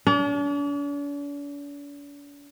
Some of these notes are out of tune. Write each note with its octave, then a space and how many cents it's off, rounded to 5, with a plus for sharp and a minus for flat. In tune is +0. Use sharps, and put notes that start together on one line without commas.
D4 -45